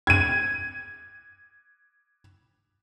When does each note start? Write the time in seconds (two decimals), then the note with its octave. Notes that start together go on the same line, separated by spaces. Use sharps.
0.07 G#6 D#7